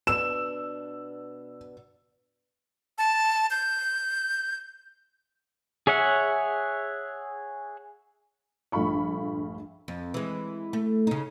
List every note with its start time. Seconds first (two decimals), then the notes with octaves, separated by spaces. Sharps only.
0.07 B2 B3 D4 E6 E7
2.98 A5
3.50 G6
5.87 G#4 C#5 E5 F#5
8.72 A#1 G2 A3 F4 B5 C#6
9.88 F2
10.14 E3 G#3
10.73 A3
11.07 C#3 D#4